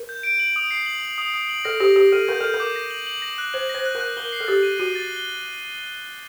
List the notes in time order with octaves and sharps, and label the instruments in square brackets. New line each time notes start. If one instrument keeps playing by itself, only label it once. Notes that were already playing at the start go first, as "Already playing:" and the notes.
Already playing: [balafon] A#4
[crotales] G6
D7
F#7
D#6
C7
F#7
F#7
D#6
D#6
F#7
[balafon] A4 [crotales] A#6
[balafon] G4 [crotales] A#6
[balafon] G4 [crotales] A#6
[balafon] A4 [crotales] D#7
[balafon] A#4 [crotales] G6
[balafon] A4 [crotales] G6
[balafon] A#4
[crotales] D6
A#6
F#7
F#7
A#6
F#6
[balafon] C5 [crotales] F#7
[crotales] A#6
[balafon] C5
[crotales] F#6
[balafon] A#4
[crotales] F#6
[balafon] A#4 [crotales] G7
[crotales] C7
[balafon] A4
[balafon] G4 [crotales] A6
[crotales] D#7
[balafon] F#4 [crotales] D#7
[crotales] A6
G7